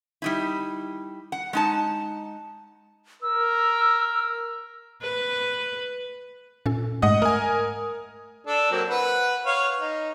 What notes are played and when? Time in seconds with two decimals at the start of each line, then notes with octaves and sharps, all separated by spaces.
0.22 G3 D#4 E4
1.32 F#5
1.53 G#3 D#4 A5
3.22 A#4 E6
5.02 B4
6.66 A#2 C#4 A4
7.02 G#2 G#3 A3 D#5 F#5 D#6
7.22 A3 A#4 G#5
8.47 D4 A4
8.71 F#3 A#3 C4
8.89 B4 F#5
9.46 C#5 F5
9.80 D#4